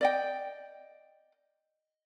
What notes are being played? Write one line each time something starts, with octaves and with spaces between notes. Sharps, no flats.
D5 D#5 G5